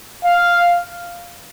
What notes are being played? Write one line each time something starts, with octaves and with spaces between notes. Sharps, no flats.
F5